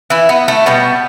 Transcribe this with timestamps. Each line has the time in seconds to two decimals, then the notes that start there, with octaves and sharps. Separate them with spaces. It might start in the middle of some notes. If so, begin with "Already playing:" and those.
0.10 E3 E4
0.29 B3
0.48 A3
0.66 B2 G3 B3